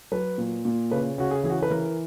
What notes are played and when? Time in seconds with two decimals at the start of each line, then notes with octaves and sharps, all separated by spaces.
0.12 F#3 B4
0.38 A#2
0.65 A#2
0.91 C#3 B4
1.18 C#3 F#4
1.31 G#4
1.43 E3 G#4
1.50 F#4
1.62 B4
1.70 E3 A#4